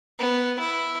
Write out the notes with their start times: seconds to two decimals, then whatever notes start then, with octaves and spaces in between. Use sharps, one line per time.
0.19 B3
0.59 E4